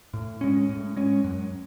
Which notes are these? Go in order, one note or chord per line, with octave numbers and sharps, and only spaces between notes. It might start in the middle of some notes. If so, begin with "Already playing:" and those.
A2
G#3 C#4
A2
G#3 C#4
F#2